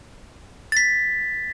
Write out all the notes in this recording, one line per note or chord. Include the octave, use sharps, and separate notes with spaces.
A6 B6